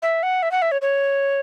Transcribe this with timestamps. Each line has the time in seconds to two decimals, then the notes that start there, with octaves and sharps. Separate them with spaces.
0.02 E5
0.23 F#5
0.43 E5
0.51 F#5
0.62 E5
0.72 C#5
0.82 C#5